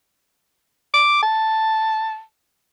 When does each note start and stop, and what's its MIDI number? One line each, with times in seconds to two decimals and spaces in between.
0.94 1.22 86
1.23 2.22 81